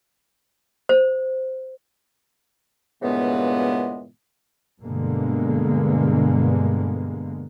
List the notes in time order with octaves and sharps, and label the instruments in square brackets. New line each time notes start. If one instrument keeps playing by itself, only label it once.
[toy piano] C5
[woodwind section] G2 A#2 C#3 E3 G#3 B3
[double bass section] G2 B2 D3 G#3 A#3 B3